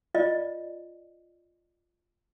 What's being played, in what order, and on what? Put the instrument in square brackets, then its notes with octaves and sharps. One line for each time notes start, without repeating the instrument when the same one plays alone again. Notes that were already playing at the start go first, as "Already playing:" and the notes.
[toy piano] F4 D5 D#5